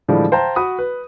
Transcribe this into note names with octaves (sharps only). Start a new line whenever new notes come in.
A2 D3 E3 F3 G3 G#3
C5 F5 G5 A5 A#5
F#4 B5 D#6
B4